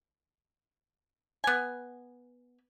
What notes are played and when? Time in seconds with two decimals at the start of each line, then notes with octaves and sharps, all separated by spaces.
1.44 B3 G#5